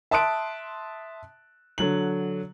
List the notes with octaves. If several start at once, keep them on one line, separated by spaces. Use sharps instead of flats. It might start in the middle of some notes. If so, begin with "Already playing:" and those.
E5 A5 C6 D#6 F#6 D7
D3 F#3 F#7